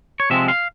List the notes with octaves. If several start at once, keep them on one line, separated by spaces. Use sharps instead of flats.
C#5
C3 F3 G#3 C4 E5
F5